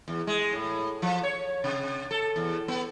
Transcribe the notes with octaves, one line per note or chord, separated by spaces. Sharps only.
E2
G#3
A2
F3
C#5
C3
A4
E2
B3